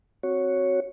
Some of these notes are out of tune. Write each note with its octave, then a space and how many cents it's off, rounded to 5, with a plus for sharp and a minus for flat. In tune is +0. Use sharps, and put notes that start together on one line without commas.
C4 +0 F#4 +0 C#5 +0